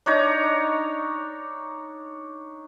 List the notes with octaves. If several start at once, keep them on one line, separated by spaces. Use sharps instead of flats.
D4 D#4 C#5 A#5